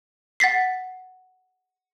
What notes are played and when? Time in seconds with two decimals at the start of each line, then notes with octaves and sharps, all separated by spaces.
0.40 F#5 A6 B6 C7